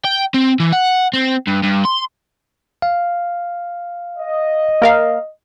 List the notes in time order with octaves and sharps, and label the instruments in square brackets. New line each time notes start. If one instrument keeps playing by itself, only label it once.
[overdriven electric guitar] G5
C4
E3
F#5
C4
G2
G2
C6
[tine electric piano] F5
[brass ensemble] D#5
[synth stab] A#3 A#4 F5